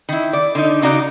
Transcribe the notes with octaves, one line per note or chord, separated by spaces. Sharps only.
D#3 E4
D5
D3 D#4
C#3 D#4 F#4 D5